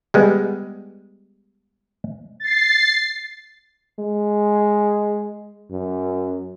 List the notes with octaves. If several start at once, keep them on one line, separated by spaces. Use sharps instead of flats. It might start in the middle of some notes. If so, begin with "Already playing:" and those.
G3 G#3 B3
A6 C7
G#3
F#2